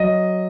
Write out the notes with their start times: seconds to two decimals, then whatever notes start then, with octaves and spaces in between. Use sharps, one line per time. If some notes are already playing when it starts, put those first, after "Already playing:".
Already playing: F#3 D#5